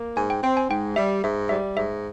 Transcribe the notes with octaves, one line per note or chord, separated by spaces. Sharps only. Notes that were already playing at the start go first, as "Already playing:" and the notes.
Already playing: A#3
G#2 G#5
G5
C4 G5
G#5
G#2 G5
G3 E5
G#2 E5
G3 E5
G#2 E5